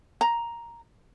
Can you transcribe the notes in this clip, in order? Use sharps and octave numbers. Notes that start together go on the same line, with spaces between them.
A#5